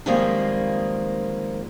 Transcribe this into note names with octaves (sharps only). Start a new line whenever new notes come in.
D#3 F3 G3 G#3 A#3 C4